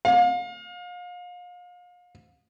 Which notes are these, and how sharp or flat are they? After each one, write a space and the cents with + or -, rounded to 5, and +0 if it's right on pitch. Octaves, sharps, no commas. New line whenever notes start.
F5 +35